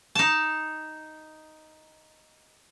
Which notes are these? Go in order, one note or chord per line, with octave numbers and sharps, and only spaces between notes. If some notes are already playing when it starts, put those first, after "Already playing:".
D#4 A5